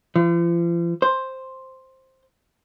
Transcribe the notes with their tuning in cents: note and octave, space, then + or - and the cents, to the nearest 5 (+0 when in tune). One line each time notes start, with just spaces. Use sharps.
F3 -45
C5 +5